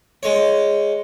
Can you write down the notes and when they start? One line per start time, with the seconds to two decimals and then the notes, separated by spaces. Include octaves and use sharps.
0.23 G#3 C#5